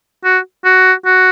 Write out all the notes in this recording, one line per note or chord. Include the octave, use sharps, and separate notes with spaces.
F#4
F#4
F#4